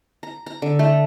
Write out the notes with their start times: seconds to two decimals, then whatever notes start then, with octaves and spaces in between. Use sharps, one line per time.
0.23 A#5
0.46 A#5
0.62 D3
0.79 A3